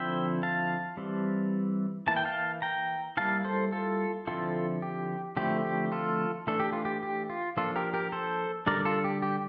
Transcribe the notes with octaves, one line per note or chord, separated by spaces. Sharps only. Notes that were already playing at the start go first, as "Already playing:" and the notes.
Already playing: D3 F3 C4 E4 E5 G5
F5 A5
E3 G3 C4
E3 A#3 E4 A5
G5
F5 A5
G5 A#5
G3 A#3 E4 F5 A5
A4 C5
F4 A4
D3 F3 C4 E4 F4 A4
G4
D3 F3 A3 C4 E4 G4
G4
F4 A4
E3 A3 D4 A4
G4
F4
G4
G4
F4
F3 A#3 D4 F4 A4
G4 A#4
G4 A#4
A4 C5
D3 G3 D4 A#4 D5
F4 A4
G4
G4